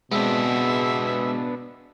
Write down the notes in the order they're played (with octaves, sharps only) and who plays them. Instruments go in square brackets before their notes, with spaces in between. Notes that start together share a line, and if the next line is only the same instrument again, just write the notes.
[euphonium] B2 [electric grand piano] G#3 C4 [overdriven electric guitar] B3 D4 [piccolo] E5